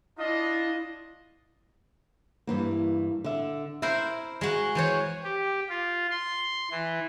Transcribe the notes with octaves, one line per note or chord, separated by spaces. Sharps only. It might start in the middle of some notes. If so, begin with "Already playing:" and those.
D4 E4 F4 D#5
G2 E3 A#3
D3 E5
E4 A#4 C5 E5
G#3 F#4
E3 C5 C#5
G4
F4
C6
E3